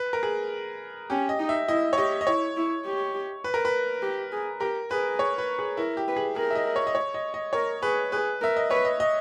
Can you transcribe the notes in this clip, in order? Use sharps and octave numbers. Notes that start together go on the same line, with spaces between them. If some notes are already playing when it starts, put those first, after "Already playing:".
Already playing: B4
A#4
G#4
C#4 G4
D#5
D#4
E5
E4 D#5
C#5
G4 D#5
D#5
E4 C#5
E4
G4
B4
A#4
B4
G4
G#4
G4 A#4
G#4 B4
C#5
B4
G#4
E4 A#4
G4
B4
G#4
G#4 A#4
E5
D#5
C#5
D#5
C#5
D#5
D#5
A#4 C#5
G#4 B4
G#4 B4
A#4 E5
D#5
B4 C#5
D#5
D#5